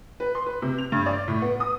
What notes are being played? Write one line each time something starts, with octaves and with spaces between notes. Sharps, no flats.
B4
C6
B4
C3
F7
G2
D5
A2
B3
D#6